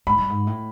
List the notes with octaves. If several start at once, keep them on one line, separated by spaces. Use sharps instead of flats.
G#2 B5
G2
G#2
A2